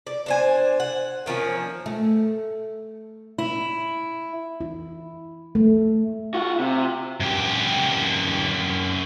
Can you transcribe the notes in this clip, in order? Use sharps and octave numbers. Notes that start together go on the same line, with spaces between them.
D5
D4 C5 G#5
F#5
D#3 F3 A#3 C#4
A3
E4
E4
A3
F4 F#4
C3
F#2 G4